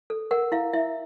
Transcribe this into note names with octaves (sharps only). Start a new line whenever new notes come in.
A4
A#4 F#5
E4 F5
E4 E5